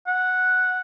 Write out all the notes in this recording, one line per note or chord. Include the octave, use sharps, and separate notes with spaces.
F#5